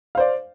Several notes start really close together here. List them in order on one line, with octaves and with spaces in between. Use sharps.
F5 C5 D5